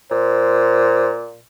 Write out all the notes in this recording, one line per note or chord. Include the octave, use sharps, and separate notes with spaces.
A#2 C5